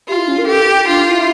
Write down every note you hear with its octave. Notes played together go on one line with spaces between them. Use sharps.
F4 G4
E4
C#4
A#4
G4 A4
D4 F4
E4